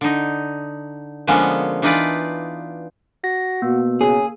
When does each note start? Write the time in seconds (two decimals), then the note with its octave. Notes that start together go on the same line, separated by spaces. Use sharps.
0.01 D3 D#4
1.27 D3 F3 G#3 A#3 B3 C#4
1.82 E3 D4 D#4 F4 B4 D5
3.24 F#4 A#6
3.62 B2 A#3
4.01 C#3 G#4